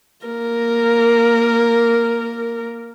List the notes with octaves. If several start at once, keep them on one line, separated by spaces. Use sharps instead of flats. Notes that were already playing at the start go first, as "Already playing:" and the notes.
A#3 A#4